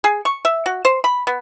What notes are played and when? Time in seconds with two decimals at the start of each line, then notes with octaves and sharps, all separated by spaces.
0.04 G#4
0.25 C#6
0.45 E5
0.66 F#4
0.85 C5
1.04 B5
1.27 B3